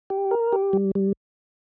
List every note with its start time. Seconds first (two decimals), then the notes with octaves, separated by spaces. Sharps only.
0.10 G4
0.31 A#4
0.53 G4
0.73 G3
0.95 G3